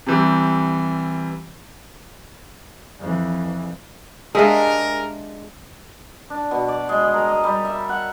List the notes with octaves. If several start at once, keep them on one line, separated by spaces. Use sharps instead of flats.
C3 E3 G3
F2 E3
G#3 D4 G4 G#4 A#4 E5 F5
D4
B2
D5
G#3
G#4
A#4
D#5
G3
E5
F#5